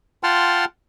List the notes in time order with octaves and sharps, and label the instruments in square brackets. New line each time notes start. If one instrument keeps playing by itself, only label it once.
[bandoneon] F4 F#5 G5 A5 C6 F6